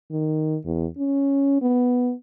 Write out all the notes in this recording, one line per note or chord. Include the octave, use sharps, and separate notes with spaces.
D#3
E2
C#4
B3